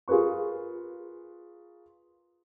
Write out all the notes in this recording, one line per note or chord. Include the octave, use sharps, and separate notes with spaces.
F4 G#4 A#4 B4 C#6